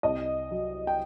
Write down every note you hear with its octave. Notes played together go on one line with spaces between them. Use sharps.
C2 D#5
F#3
G5